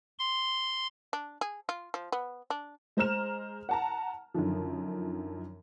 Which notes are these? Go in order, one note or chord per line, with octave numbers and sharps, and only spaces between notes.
C6
D4
G#4
F4
F3
B3
D4
G#3 C5 A#5 F6 E7
F#5 A5 A#5
F#2 D3 D#3 F3